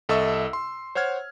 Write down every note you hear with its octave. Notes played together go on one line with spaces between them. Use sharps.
C2 A4 D#5 E5 C#6 E6
C6
C5 C#5 F#5 F6 G#6